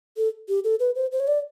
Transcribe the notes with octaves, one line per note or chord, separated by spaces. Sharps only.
A4
G4
A4
B4
C5
C5
C#5
D5